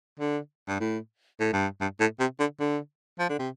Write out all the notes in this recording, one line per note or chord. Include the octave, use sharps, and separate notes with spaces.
D3
G2
A2
A2
G2
G2
A2
C3
D3
D3
F3
D3
C3